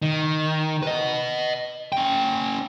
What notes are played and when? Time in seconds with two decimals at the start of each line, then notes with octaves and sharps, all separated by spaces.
0.02 D#3
0.83 B4 D#5
1.92 C#4 G5